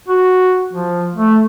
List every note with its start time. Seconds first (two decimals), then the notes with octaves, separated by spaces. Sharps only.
0.08 F#4
0.73 F3
1.16 A3